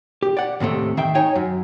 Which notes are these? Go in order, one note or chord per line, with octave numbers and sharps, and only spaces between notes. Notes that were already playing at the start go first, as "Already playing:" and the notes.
G4
D5 F#5
D#2 A2 C3 A3
D#3 E5 G5
D#4 C#5 G5 G#5
F#2